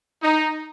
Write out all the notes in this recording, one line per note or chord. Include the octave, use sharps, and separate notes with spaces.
D#4